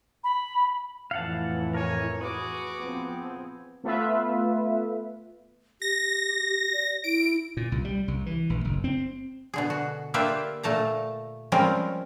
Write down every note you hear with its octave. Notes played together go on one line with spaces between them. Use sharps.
B5
F2 A2 E3 F5 F#5 A5
A#4 C#5 G#5
F#4 G#4 B4 D6
F3 B3 C4
A3 B3 F4 B4 E5
G4 A#6
D5
E4 D7
A#2
C2
G3
C2
E3
A#1
F#1
C4
B2 D3 G#4
F#4
A#3 D4 F4 G4 B4 E5
A#2 A3 A5 A#5
F3 G3 G#3 C4 C#4 A#4